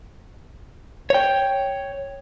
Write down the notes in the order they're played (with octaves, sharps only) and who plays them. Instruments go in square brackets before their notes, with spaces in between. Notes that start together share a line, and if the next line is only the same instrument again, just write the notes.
[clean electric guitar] C#5 G5